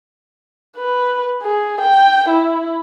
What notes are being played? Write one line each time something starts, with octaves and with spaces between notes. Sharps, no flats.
B4
G#4
G5
E4